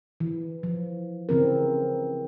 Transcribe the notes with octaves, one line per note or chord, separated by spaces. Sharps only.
E3
F3
C#3 E3 C4 A#4